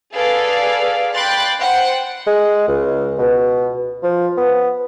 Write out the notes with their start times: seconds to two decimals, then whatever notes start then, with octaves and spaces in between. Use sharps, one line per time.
0.15 G#4 A4 B4 D5 F5
1.15 G5 B5 C6 D6 F#6 A6
1.60 C5 F#5 G5
2.27 G#3
2.68 C#2
3.18 B2
4.03 F3
4.38 B3